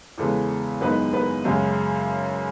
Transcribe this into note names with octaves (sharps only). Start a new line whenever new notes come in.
E2 C#3 G#3 B3 A4
F#2 D#3 G#3 B3 D#4 B4
B3 B4
F#2 C#3 G#3